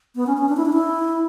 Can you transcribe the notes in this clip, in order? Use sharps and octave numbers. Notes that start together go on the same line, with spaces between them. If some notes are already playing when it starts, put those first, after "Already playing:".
B3
C#4
C#4
D4
E4
D4
E4